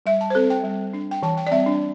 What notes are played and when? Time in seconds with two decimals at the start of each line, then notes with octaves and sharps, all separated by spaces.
0.06 G3 E5
0.21 A5
0.30 C5
0.35 C4 A4
0.50 G5
0.64 G3
0.94 D4
1.11 G5
1.23 E3 A5
1.38 G5
1.47 D5
1.51 G3 C4 E5
1.66 D4